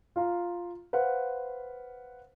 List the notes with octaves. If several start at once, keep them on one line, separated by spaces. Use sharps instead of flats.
F4 F5 A#5
B4 C5 F5 F#5